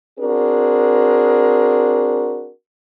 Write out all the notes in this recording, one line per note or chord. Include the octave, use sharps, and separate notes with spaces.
C4 D4 F#4 G#4 A#4